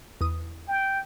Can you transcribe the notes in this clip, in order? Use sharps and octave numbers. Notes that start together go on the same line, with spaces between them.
E2 D#6
G5